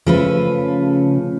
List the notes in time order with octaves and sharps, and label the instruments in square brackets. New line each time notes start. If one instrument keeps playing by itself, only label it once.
[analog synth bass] C#3 [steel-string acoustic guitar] F3 A3 B4